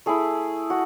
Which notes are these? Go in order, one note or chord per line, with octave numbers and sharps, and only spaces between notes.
A3 E4 G#4
F#4